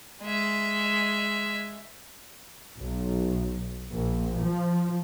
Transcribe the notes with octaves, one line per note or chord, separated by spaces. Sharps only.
G#3 E5
B1
A#1
F3